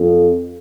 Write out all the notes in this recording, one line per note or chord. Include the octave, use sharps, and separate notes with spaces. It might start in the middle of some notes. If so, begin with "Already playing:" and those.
Already playing: F2